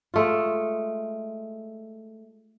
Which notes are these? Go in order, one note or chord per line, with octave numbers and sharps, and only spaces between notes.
G#3 A3 F4